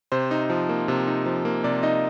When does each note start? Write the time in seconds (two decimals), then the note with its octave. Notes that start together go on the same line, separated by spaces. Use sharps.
0.12 C3 C5
0.31 D#4
0.50 F3
0.69 A#3
0.88 C3
1.07 D#4
1.26 F3
1.45 A#3
1.64 C3 D5
1.83 D#4 D#5